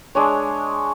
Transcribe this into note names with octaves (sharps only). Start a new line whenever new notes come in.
G#3 D4 C#5